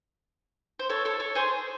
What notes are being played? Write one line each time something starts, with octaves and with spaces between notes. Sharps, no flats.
C5
A4 C#5
A4 C#5
A4 C#5
G#4 C5